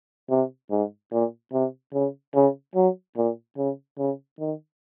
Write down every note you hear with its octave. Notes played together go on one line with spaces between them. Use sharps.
C3
G#2
A#2
C3
C#3
C#3
F#3
A#2
C#3
C#3
D#3